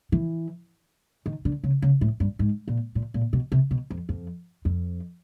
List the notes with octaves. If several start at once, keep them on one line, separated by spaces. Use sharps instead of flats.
E3
D#3
D3
C#3
C#3
A2
G2
G#2
A#2
A#2
A#2
B2
C3
B2
F2
F2
F2